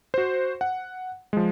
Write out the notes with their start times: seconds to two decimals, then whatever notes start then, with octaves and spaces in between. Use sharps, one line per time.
0.14 F#4 C5
0.61 F#5
1.33 F3 G#3